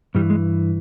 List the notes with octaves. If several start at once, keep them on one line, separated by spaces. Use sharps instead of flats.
G2 E3 G3
G#3